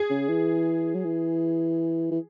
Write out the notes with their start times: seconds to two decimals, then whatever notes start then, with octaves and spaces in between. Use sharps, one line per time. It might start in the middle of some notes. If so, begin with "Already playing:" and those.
Already playing: G#4
0.10 C#3
0.28 E3
0.94 F#3
1.05 E3
2.11 E3